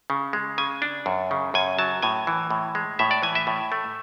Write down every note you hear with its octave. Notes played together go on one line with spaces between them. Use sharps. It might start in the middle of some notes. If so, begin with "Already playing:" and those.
C#3
G#3
C#3 G#5
D4
F#2
C#3
F#2 G#5
F#3 A5
A2 G#5
E3
A2
G#3
A2 E5
D5
E3 G#5
E5
A2
A3